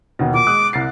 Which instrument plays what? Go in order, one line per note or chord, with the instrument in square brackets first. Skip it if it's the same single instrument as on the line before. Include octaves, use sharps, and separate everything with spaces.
[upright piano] D#2 B2
[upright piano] A#2 [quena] D6
[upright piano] G#3 D#6 F#6
C2 A6 C7